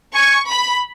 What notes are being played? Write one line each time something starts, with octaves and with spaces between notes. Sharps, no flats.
G#5 C#6
B5